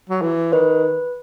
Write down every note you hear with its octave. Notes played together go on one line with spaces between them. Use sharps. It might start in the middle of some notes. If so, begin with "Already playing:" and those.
F#3
E3
D#3 B4